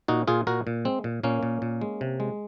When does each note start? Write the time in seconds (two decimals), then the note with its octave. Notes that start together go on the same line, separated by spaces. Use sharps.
0.08 A#2 D#4 F#4
0.28 A#2 F4 G#4
0.47 A#2 F#4 A#4
0.67 A#2
0.85 G#3 C4
1.04 A#2
1.23 A#2 A#3 C#4
1.43 A#2
1.62 A#2
1.81 G#3
2.01 C3
2.20 G#3